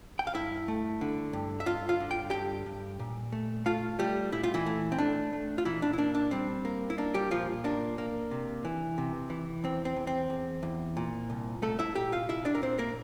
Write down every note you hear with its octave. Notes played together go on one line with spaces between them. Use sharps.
G5
F5
G2 E4 E5
A3
D3
G2
E5
G2 F4 F5
F4 F5
D3
G5
G2 G4 G5
G2
A#2
A3
A3 F4 F5
G3 A3 G4
A#2 E4
F4
E3 E4
A3
C4
A3 D4
A3
F4
A#2 E3 E4
D4
E4
A#3 D4
D4
G3 C4
A#3
E4
A#3 D4
G3 G4
A#2 F3 F4
A#3 D4
A#3
C3
E3
C3
E3
E2 C4
C4
E2
C4
E2
E2
A#2
C2
C2 A3 A4
E4 E5
A#2 G4 G5
F4 F5
C2 E4 E5
D4 D5
A#4
A#2 C4 C5
A#3 A#4